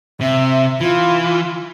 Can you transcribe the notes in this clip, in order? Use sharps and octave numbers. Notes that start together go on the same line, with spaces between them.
C3 E5
E3 F4